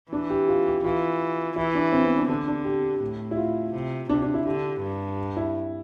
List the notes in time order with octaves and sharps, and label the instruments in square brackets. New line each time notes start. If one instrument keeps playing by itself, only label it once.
[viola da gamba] E3 [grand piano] D4
[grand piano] G4
F4
G4
[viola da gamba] E3 [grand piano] F4
[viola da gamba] E3 [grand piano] E4
[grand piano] D4
C4
B3
D4
[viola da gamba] D3 [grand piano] D4
[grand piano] D4
G4
[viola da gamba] A2
[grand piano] E4
F4
[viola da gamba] C3
[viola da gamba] C3 [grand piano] D4
[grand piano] D4
E4
[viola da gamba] D3 [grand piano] G4
[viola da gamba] G2
[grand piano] E4